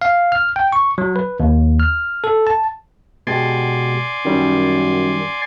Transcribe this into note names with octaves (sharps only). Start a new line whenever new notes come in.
F5
F6
G5
C#6
F#3
B4
D#2
F6
A4
A5
B2 G#3 G4 D5 G#5 C6
F#2 D#3 G3 C#4